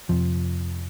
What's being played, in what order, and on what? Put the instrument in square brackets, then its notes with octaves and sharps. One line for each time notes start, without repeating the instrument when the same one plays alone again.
[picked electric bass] F2 C3 F3